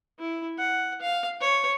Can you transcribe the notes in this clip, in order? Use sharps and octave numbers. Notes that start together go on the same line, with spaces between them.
E4
F#5
F5
C#5